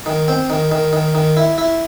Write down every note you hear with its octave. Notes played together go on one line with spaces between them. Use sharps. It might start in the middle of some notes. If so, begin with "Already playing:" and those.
D#3
C4
D#3
D#3
D#3
D#3
E4
E4